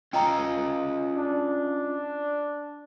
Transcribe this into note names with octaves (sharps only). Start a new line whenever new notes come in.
C#4 F4 D#5 G5 A#5
D4